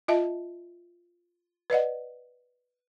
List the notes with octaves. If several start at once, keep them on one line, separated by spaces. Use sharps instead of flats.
F4 D#5 E5 A5
B4 D5 D#5 F#5